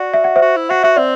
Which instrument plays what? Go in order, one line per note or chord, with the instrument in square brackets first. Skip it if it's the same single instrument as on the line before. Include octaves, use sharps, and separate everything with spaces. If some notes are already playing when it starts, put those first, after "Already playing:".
Already playing: [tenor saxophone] F#4 [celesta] D5 F#5
[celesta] E5
F#5
C5 E5
[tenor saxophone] F#4
E4
[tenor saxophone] F#4 [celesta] F#5
[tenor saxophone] F#4 [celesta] E5
[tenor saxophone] C4 [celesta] D5